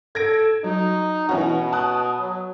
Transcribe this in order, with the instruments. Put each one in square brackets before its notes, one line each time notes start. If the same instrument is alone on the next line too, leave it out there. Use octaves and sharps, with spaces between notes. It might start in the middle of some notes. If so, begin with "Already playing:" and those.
[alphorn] A4 [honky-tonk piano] G#6 A#6 D7
[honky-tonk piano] F#3 [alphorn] D#4
[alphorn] B2 [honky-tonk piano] E3 C#4 F#4
[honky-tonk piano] A5 D#6 F#6
[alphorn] F#3